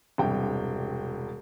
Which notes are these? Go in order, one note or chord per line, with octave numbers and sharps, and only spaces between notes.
E1 G2 C3 G5